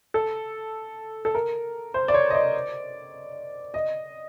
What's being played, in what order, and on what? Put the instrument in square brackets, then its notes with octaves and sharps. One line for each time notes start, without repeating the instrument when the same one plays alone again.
[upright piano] A4
A4
A#4
C5
D5
C#5
D#5
D5
D#5